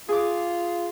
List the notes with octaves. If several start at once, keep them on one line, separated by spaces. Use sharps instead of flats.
F4 G#4 D6